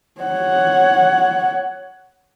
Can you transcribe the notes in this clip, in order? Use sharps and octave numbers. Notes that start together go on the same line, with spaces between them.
C#5 F#5